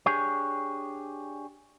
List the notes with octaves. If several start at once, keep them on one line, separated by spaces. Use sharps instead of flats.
D4 G4 G#4 C#5